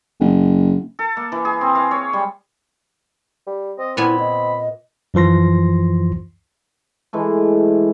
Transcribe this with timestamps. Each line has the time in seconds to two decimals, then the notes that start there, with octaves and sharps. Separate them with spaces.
0.20 F#1
0.99 A4
1.17 A#3
1.32 E3
1.45 G#4
1.61 C4
1.75 F5
1.91 C#5
2.13 G3
3.47 G3
3.79 C4 D#5
3.97 A#2 B3 E4 G#5 B5
4.19 D#5
5.14 F#2 E3 F3 C6 A#6
7.13 E3 G#3 A3